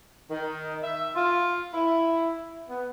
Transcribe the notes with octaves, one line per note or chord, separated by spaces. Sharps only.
D#3
E5
F4
E4
B3